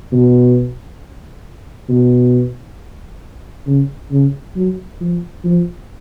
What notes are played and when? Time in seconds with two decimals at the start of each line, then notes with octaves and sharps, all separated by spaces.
0.12 B2
1.89 B2
3.67 C#3
4.11 C#3
4.56 F#3
5.00 F3
5.44 F3